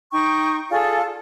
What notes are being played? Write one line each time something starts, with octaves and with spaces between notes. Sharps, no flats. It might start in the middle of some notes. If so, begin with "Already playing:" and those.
D#4 G5 C#6
F4 G#4 A4 D5